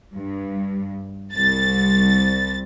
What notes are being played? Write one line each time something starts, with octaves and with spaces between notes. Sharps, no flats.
G2
C2 A6